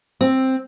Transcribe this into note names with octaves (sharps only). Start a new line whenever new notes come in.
C4